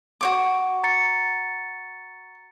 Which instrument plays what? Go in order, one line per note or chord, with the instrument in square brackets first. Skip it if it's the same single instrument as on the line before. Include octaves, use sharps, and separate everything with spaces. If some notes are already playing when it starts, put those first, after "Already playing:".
[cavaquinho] F#4 C#5 D6
[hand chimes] A#5 A6 C#7